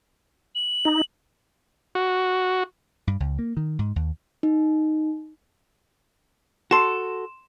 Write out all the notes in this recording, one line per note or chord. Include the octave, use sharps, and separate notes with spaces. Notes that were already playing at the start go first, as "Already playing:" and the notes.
F#7
D#4
F#4
G2
C#2
A#3
D#3
G#2
D#2
D#4
F#4 A4 C6 E7